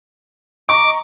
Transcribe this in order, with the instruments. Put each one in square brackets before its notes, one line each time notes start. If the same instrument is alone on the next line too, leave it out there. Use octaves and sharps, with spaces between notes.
[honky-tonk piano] D#5 A#5 C#6 [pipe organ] D6